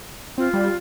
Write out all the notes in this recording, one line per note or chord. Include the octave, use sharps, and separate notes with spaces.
C4 F4
G3